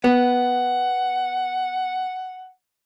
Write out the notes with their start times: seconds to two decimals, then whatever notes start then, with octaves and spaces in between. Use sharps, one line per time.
0.04 B3 F#5